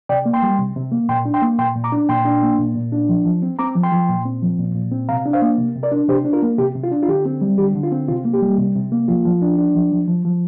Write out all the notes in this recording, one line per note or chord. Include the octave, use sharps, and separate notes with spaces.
C3 D5 G5
A#3
G5 C6
G3
C3
C3
A#3
A#2 G5 C6
D4
G5 C6
A#3
A#2 G5 C6
A#2
A#5 D6
D4
A#2 G5 C6
D4
A#3
A#2
A#2
D4
F3
F3
C4
C4 A#5 D6
F3
G5 C6
F3
A#2
C4
F3
A#2
A#2
C4
C3 F5 A#5
D4
C5 F5
A#3
C3
C3
A#4 D5
D4
C3 G4 C5
D4
F4 A#4
A#3
C3 G4
C3
F4
D4
F4
D3 G4
C4
G3
D3 G4
D3
F4
C4
C3 F4
A#3
G4
G3
C3
C3
A#3
F3 F4
F3
D4
D4
F3
F3
F3
F3